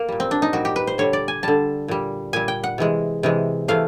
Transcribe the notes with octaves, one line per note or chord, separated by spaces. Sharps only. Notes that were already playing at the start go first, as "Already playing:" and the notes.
Already playing: A#3
A#2 G3
C4
D4
D#4
A#2 G3 F#4
G4
B4
C5
D3 G3 C#5
D5
G#5
D3 G3 A5
A#2 G3
A#2 G3 G#5
G5
F#5
C3 E3 G#3
C3 E3 G#3
C3 E3 A3 F5